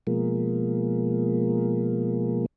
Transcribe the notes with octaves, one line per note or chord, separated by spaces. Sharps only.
B2 F3 G#3 A#3